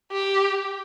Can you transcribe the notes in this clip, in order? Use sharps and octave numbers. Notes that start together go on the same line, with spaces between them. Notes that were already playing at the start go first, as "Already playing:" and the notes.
G4